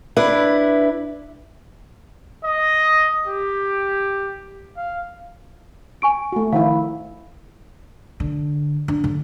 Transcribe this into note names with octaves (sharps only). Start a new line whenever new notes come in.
D4 E4 B4
D#5
G4
F5
G#5 C#6 D7
A3 F#4
D#3 F3 E4 F5 F#5
D3
D4
D3